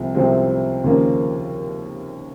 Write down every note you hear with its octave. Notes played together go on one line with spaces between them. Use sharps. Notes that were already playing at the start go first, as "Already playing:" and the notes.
Already playing: C2 C3 F3 G#3 C4
C2 C3 F3 G#3 C4
D#2 C#3 F3 A#3